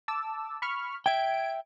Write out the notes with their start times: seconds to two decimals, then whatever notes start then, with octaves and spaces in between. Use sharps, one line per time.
0.08 A5 D6 E6
0.62 B5 C#6 F6
1.06 E5 G5 G#6 D7